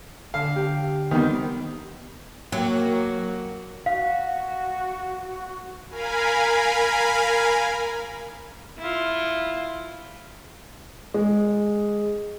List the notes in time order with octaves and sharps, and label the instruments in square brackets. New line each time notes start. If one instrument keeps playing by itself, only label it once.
[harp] D3 [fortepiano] F5
[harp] G4
[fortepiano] D#3 G3 [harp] B3 C4
[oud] F#3 [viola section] A#3 F#4
[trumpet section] F#4 [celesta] F5
[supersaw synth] A#4 F5 G#5 B5
[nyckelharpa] E4 F4
[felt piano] G#3